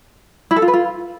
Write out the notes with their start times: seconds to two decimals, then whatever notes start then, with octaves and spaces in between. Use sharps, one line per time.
0.51 E4
0.56 A4
0.62 F4
0.68 B4
0.73 F4